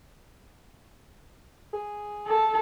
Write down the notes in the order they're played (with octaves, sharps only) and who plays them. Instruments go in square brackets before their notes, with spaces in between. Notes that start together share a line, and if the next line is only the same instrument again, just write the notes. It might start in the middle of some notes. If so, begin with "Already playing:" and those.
[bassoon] G#4
[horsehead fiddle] A4